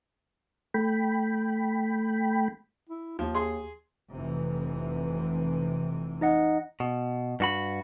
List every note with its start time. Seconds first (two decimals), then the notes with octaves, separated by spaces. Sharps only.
0.74 A3 G5 B5
2.89 E4
3.19 D#2 F3
3.34 G#4 C6
4.11 F1 C3 E3
6.21 D#4 D#5 F#5
6.80 B2
7.40 G2 F#4 B5